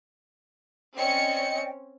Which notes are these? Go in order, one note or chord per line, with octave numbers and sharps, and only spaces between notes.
C4 C#4 D5 D#5 G5 C#7